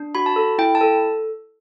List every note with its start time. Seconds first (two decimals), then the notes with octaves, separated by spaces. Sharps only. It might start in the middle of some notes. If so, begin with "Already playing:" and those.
Already playing: D4
0.15 F#4 B5
0.26 A5
0.36 A4
0.58 E4 G5
0.75 A5
0.81 A4